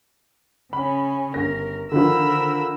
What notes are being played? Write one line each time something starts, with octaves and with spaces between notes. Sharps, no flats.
C#3 C#4 B5
G1 A#4 A#6
D3 D#3 F3 A#4 B5 E6